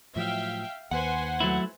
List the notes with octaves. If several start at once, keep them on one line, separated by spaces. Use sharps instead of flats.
A2 F3 F#3 E5 F5 G5
D#2 B4 C5 F#5 G#5
F#3 A3 E4